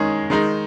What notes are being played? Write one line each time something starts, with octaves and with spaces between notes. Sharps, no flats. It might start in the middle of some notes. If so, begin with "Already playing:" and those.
Already playing: D#3 G#3 C#4 G#4
D#3 G#3 D#4